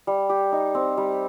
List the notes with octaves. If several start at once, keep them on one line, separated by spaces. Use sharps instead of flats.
G3
G4
D#4
C4
G3